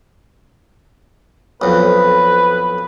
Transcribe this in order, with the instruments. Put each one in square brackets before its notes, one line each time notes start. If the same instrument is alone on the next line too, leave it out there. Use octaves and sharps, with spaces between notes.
[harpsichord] B1 F2 [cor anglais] B4